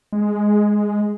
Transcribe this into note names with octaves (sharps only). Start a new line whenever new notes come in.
G#3